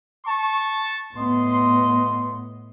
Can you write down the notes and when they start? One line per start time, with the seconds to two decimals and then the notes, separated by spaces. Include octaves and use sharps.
0.25 A5 C#6
1.15 A2 B3 D#5 C6